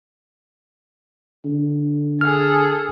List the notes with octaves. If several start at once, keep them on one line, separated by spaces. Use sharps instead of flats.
D3
G#4 A4 F6